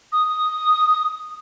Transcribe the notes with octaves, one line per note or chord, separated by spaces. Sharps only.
D#6